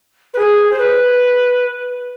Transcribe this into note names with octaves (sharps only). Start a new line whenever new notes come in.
B4
G#4
C5
B4